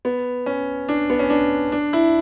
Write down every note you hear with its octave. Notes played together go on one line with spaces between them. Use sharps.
B3
C#4
D4
B3
C#4
D4
D4
E4